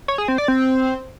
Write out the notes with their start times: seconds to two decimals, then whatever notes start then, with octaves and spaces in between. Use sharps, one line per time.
0.08 C#5
0.18 G#4
0.28 C4
0.38 D5
0.48 C4